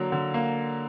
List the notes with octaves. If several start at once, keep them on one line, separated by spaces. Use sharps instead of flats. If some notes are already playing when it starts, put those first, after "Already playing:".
Already playing: D3 F#3 A#3
D3
A#3